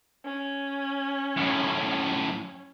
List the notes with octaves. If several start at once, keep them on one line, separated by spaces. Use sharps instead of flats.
C#4
F#2 A2